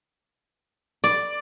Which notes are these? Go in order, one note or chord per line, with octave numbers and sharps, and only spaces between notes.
D5